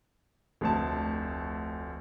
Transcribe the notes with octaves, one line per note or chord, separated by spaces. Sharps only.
F1 D2 A5